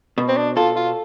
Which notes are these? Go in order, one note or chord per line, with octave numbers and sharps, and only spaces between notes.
B2
C4
D4
F4 A4
F4